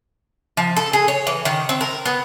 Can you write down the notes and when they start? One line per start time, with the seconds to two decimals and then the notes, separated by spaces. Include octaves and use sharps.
0.57 F3
0.77 A4
0.93 G#4
1.08 C#5
1.27 E3
1.45 D#3
1.69 C4
1.81 A#4
2.06 B3